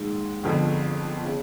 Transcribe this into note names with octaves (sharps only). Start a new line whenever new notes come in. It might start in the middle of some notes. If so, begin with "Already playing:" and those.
Already playing: A#1 G#2 D#3 G#3
G1 F2 D3 F3
C#3